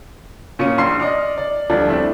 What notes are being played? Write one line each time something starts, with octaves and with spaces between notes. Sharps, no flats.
A#2 C#4 D#6 C#7 D#7
A#1 C6 C7
D5 D#5 D6 D#6 F6
D5
D2 F3 G3 D5
A3 C4 D4 E4